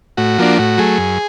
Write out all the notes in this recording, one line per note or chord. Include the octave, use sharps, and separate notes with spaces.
A2 F#4
F3 A#3 D4
A2 F#4
F#3 A3 G#4
F#2